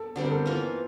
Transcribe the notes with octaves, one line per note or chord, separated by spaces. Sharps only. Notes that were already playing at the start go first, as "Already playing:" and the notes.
Already playing: A4
D3 G3 C4 A4
A#4
A4
E3 A#3 F4 A#4